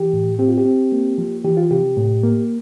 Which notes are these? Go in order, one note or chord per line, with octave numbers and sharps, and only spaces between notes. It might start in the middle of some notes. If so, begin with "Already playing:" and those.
Already playing: E3 G4
A2
C4 G4
F4
G4
C4
A#3
F3
E3 G4
F4
C3 G4
A2
A#3